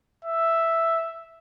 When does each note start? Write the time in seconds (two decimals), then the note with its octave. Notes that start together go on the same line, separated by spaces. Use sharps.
0.25 E5